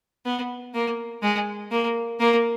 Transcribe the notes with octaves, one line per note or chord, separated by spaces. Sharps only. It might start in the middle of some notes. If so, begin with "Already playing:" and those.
B3
A#3
G#3
A#3
A#3